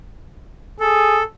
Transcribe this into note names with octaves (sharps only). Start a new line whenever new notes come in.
G#4 A4